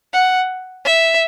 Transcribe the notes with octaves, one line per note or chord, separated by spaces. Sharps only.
F#5
E5